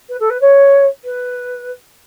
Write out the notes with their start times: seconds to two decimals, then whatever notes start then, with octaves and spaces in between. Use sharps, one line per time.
0.09 B4
0.20 A4
0.30 B4
0.41 C#5
1.05 B4